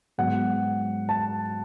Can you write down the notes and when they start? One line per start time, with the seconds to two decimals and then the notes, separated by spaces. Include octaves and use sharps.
0.18 G#2 F#3 B3 F#5
1.09 A5